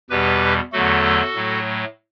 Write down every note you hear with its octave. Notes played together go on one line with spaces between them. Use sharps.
E2 B2 G3 G4 B4
E2 D3 F#3 A3 F#4 A4
A2 F#3 A3